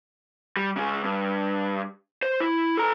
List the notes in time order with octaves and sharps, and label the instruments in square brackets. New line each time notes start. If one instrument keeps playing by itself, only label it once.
[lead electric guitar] G3
C#3 G#3
G2
C5
E4
A4 A#5